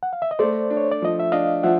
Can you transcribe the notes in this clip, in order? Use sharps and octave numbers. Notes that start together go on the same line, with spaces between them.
F#5
F5
E5
D#5
A3 C5 D5
D4
C#5
D5
F3 D#5
E5
D4 D#5 F5
F3 E5 F#5